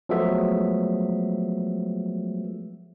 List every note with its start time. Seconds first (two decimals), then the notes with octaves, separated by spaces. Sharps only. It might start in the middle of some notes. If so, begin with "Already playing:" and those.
0.09 F3 F#3 G#3 A3 B3 E5